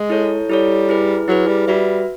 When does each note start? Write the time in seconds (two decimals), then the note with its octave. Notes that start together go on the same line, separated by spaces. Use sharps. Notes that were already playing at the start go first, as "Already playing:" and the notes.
Already playing: G#3
0.10 E4 A4 C#5
0.49 G3 E4 A4 C#5
0.89 E4 G#4 B4
1.28 F#3 E4 G#4 B4
1.48 G3
1.67 G3 F#4 B4 E5